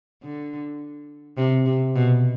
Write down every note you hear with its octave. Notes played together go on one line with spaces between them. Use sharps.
D3
C3
C3
B2